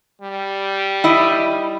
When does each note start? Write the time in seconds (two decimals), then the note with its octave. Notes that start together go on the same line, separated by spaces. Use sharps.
0.22 G3
1.04 E4 D#5